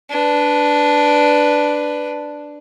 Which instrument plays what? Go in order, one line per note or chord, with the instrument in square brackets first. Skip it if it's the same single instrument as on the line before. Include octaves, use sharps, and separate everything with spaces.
[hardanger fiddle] D4 B4